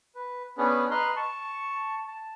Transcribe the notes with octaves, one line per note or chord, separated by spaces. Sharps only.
B4
B3 C#4 D4 G#4 B4
B4 D#5 A#5 C6 F6 F#6
A5 C#6
A5